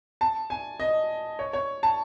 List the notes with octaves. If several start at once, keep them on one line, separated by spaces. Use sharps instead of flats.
A5
G#5
D#5
C#5
C#5
A5